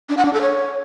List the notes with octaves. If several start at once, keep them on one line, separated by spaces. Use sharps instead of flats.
D4
F#5
D4
A4
C#5